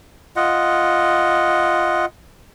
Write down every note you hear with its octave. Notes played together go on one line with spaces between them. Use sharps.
F4 D#5 F#5